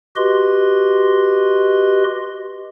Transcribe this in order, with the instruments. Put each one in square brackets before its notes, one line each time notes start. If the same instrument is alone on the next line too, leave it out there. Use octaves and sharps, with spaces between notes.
[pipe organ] F#4 G4 B4 D#5 C6